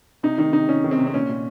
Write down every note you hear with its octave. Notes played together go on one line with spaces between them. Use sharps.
C3 D#4
D#3 D#4
C3 D#4
C3 C#4
D#3
C4
C3
C4
A#2 C#4
A#2